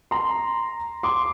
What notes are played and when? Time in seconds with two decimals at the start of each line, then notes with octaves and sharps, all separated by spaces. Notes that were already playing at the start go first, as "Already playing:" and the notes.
0.11 A#5 C6
1.03 C6 D6